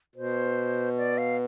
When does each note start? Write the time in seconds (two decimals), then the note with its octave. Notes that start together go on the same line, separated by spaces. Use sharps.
0.16 B2 C5
0.97 D5
1.18 F5